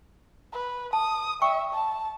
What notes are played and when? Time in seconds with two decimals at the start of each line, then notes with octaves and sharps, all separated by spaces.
0.53 B4
0.93 A5 D#6
1.42 D5 E5 G5 C#6
1.73 A5